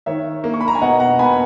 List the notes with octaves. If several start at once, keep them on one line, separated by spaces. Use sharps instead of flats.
D#3 C#5 E5
A#3
C#6
B5
A#5
G#5
B2 D#5 F#5
F#5 A#5
B2 G#5 B5